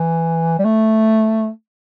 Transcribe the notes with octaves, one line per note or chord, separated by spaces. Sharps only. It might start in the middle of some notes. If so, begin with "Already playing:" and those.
Already playing: E3
G3
A3